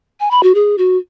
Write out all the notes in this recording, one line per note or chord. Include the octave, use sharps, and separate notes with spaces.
G#5
B5
F#4
G#4
F#4